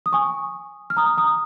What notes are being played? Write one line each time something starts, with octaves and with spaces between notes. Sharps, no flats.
D#6
G#5 C#6
F6
A#5 D#6
A#5 D#6